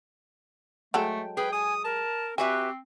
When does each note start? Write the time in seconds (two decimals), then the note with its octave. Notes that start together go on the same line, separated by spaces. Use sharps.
0.94 F#3 G#3 A3 A4 G5
1.37 G#4 B4 G5
1.52 G#5 D#6
1.84 A#4 A5
2.38 C4 F#4 G4 B4 E5 G#5